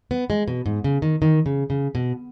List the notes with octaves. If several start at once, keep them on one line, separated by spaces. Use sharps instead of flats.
B3
G#3
B2
G#2
C#3
D#3
D#3
C#3
C#3
B2